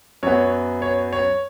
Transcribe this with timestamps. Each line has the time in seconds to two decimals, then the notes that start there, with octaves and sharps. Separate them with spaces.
0.23 F#2 F#3 B3 C#5
0.82 C#5
1.13 C#5